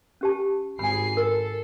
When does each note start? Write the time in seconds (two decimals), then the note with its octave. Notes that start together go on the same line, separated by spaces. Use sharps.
0.21 C#4 G4 A5
0.79 G#1 G#4 G#5 B5 C7
1.17 A4 A#4